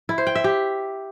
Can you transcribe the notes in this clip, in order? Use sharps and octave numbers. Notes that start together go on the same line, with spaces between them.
E4
C5
G5
E5
G4